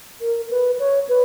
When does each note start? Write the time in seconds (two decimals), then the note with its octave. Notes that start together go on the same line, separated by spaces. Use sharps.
0.21 A#4
0.51 B4
0.79 C#5
1.09 B4